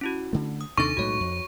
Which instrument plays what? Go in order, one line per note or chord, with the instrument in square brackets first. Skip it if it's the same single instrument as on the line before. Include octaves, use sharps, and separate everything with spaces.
[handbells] C#4 E4 F#4
[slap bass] D3 A3
[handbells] D#6
[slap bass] D#2 C3 D4 [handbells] D#4 A4 A6 [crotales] C#6
[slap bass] B1 A2 G#3 [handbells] F#4 C#5
[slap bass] F2